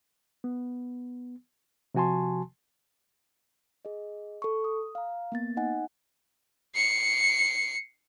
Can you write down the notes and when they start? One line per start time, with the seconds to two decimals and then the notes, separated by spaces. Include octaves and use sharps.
0.44 B3
1.95 C3 F3 F#4 G#5 A5 C6
3.85 G#4 D#5
4.42 A4 C#6
4.64 D#6
4.95 F5 A#5
5.32 A#3 B3 A6
5.57 D#4 D#5 F#5 G#5
6.75 C7 C#7